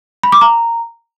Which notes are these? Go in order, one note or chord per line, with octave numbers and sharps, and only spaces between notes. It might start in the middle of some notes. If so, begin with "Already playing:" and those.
B5
D6
A#5